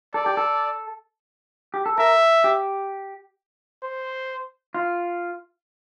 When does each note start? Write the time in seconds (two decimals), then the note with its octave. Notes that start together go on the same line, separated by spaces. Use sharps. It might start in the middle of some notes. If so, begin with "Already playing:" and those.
0.14 A4 D5
0.26 G4
0.37 A4
1.74 G4
1.86 A4
1.98 A#4 E5
2.44 G4
3.83 C5
4.75 F4